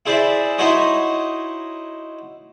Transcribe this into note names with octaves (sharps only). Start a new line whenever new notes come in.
E4 G#4 C5 D5 E5
D#4 E4 F#4 C5 C#5 D#5